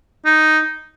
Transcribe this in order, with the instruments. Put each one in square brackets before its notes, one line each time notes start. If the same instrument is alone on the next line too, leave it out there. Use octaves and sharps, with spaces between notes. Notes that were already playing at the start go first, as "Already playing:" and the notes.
[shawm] D#4